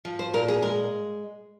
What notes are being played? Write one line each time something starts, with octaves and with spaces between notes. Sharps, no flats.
F3
C5
A#2 A#4
G#4
G#3 A#4